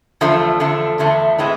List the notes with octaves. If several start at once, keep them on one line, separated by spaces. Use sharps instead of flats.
E2 D3 F3 A3 D4
E2 D3 F3 A3 D4
E2 D3 F3 A3 D4
A2 E3 G#3 C4 E4